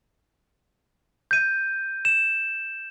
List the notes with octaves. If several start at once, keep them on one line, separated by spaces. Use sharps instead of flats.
G6 D#7
E7